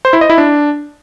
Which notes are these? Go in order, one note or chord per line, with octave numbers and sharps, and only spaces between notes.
C5
E4
D#5
E4
D4